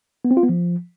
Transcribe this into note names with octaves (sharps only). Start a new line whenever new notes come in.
B3
C4
F4
B3
F3